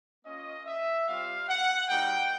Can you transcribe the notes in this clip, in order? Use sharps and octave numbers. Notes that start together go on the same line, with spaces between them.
A#3 C#4 F4 D#5
E5
G3 C4 F4 F5
F#5
G3 A#3 D#4 F#4 G5